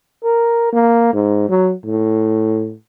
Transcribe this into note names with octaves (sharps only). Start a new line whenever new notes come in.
A#4
A#3
G#2
F#3
A2